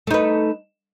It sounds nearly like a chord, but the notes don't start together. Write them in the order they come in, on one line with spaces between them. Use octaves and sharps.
A3 D#4 B4